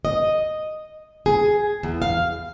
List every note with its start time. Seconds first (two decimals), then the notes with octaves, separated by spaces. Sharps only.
0.05 D#5
1.26 G#4
1.83 E2
2.02 F5